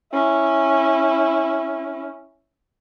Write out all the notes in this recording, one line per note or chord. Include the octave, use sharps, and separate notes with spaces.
C#4 E4